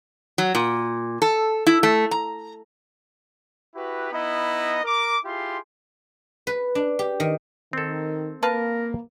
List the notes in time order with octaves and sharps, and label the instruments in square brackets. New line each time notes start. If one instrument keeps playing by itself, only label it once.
[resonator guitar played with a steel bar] F#3
A#2
A4
E4
A3
A#5
[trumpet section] E4 F#4 G4 B4
B3 D#4 E4 D#5
A#4 D6
E4 F4 G4 G#4 C6
[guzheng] B4
D4
G4
D#3
[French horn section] D#3 [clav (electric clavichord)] C4 A4
[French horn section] A#3 [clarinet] A#4 [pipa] B4 F5 A5